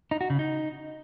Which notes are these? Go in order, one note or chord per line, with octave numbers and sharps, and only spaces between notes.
D#4
F#4
C#3
D#4